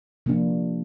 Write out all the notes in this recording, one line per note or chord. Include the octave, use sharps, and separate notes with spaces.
C3 F3 A#3 D4